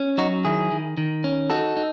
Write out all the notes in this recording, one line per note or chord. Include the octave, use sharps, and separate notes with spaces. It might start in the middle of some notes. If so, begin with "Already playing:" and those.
Already playing: C#4
F#3 D#4 F#4
D#3 E4 G#4
D#3
D#3
C#4
D#4 F#4 A4
D#4